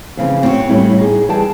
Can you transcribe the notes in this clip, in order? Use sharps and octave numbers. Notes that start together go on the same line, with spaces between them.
F2 C#3 E3 C4
C4 C#4 E4 F#4 C#5
A2 G3 A3 C#4 E4
D#4 G#4
E3 G3 G#4 G5 A5